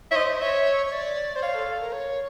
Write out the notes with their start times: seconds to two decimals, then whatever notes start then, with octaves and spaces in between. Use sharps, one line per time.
0.11 C#5 E5
0.16 C5 D#5
0.41 C#5 E5
0.86 C#5
0.92 D5
1.36 C5
1.42 C#5 F5
1.55 A4
1.68 A4
1.80 A#4
1.93 C#5